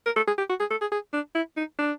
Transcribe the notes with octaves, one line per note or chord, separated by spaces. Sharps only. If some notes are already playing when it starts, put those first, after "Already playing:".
A#4
A4
G#4
G4
F#4
G#4
A4
G#4
G#4
D4
E4
D#4
D4